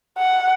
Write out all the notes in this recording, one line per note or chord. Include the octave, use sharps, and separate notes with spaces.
F#5